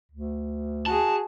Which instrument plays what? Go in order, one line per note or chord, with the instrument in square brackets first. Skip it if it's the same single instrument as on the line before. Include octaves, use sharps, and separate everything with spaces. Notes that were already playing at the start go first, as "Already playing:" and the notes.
[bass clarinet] D2
[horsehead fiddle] F#4 G#4 [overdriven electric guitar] A5